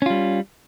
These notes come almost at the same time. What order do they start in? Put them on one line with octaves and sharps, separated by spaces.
C#4 F4 G3